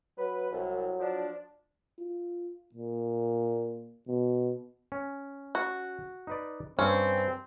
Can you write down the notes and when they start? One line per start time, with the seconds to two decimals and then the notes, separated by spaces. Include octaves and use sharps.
0.18 F#3 B4
0.51 C2 F#3
1.00 F3 D4
1.99 F4
2.74 A#2
4.08 B2
4.92 C#4
5.55 F#4
6.27 D#4 B4 D5
6.79 G2 C4 C#4